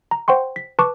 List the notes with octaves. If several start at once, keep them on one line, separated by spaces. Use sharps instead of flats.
A#5
C5 F#5 G5 C6 C#6
B6
B4 A5 C#6 D6